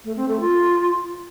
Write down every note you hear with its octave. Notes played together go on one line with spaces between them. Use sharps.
A3
C4
A3
F4